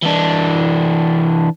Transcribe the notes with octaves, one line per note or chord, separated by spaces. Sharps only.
E3 D4